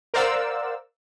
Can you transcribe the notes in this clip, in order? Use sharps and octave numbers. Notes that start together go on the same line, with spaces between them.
A#4 C5 D5 F5 F#5 E6